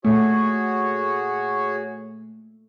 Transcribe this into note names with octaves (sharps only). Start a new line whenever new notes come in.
A#2 A3 F#4 G#4 C#5